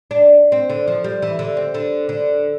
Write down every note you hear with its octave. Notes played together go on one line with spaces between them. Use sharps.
D4
C4
D3
F3
G3
E3
D3
C4
D3
D3